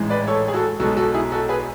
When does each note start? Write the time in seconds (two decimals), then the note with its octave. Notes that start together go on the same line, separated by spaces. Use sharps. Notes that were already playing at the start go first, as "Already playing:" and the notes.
Already playing: A1 G#2 E3 G#3
0.10 B4 D5
0.27 A4 C#5
0.48 G#4
0.54 F#4 A4
0.80 B1 B2 G#3 F#4 A4
0.97 F#4 A4
1.14 E4 G#4
1.32 F#4 A4
1.49 G#4 B4